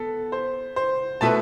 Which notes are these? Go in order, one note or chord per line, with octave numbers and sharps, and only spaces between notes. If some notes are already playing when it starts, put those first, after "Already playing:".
Already playing: B3 A4
C5
C5
B2 A3 E4 B4 A5